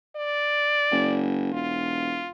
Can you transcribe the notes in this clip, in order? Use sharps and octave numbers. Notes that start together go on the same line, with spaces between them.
D5
F#1
E1 F4